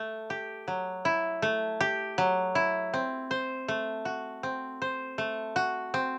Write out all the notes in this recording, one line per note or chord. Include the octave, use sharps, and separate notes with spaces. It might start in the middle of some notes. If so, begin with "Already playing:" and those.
Already playing: A3
G4
F#3
E4
A3
G4
F#3
E4
C4
C5
A3
F#4
C4
C5
A3
F#4
C4